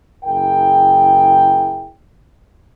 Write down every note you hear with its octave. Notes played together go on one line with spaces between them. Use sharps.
F#1 E4 G#4 A#4 G5